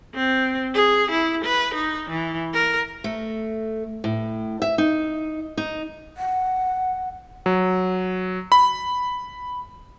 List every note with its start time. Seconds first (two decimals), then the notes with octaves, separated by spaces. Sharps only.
0.15 C4
0.75 G#4
1.11 E4
1.45 B4
1.75 D#4
2.10 E3
2.54 A#4
3.04 A3
4.04 A2
4.62 E5
4.78 D#4
5.57 D#4
6.17 F#5
7.46 F#3
8.52 B5